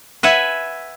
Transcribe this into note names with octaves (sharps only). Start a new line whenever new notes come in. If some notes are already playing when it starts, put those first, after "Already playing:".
B4 E5 F#5 G#5